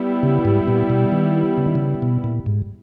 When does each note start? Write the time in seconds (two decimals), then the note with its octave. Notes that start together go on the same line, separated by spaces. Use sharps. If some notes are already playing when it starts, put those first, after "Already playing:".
Already playing: G3 B3 E4
0.23 C#3
0.45 G#2
0.68 A#2
0.90 B2
1.12 D#3
1.58 C#3
1.66 D#3
1.75 C#3
2.02 B2
2.24 A#2
2.46 G#2